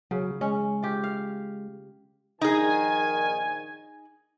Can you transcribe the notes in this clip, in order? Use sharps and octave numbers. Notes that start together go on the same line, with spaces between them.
C#3 F#3
G#3 C#4
F4 G4
F5
A#1 D#3 D#4 G#4 G#5